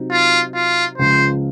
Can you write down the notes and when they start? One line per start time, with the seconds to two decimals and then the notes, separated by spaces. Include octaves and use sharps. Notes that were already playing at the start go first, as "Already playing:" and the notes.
Already playing: C3 F#3 C4 D#4
0.11 F4
0.55 F4
0.98 C#2 C#3 F3 C5